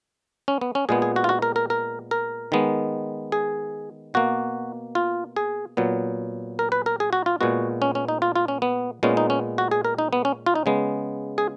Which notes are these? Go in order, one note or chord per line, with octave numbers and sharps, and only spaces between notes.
C#4
B3
C#4
A#2 G#3 B3 G#4
G#4
F#4
F4
F#4
A#4
A#4
A#4
A#4
D#3 G#3 B3
G#4
B2 A#3 F#4
F4
G#4
A#2 F#3 B3
A#4
B4
A#4
G#4
F#4
F4
A#2 G#3 B3 F#4
C#4
C#4
D#4
F4
F4
C#4
B3
A#2 G#3 B3 C#4
D#4
C#4
F#4
G#4
A#4
D#4
B3
C#4
F4
D#4
C#3 G#3 B3
G#4